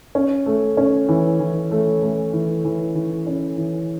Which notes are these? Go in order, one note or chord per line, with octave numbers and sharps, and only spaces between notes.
C#4
A3
C#4
E3
E3
A3
A3
E3
E3
E3
C#4
E3